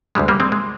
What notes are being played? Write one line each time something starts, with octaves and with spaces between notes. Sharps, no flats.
D2 D3 G3 G#3
G3 A#3
G#3 C4
G#3